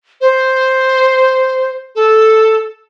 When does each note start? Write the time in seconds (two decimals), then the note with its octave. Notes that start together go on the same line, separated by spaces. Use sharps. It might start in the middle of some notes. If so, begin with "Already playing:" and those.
0.21 C5
1.95 A4